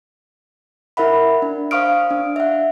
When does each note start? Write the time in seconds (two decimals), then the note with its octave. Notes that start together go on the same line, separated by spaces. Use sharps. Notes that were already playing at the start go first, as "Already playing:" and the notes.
0.97 E4 A#4 E5 F#5 B5
1.42 D4
1.71 C5 F5 C#6 D#6 F6 D7
1.86 F5
2.11 D4
2.36 E5 F#5